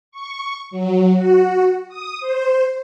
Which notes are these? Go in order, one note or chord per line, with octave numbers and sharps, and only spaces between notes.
C#6
F#3
F#4
D#6
C5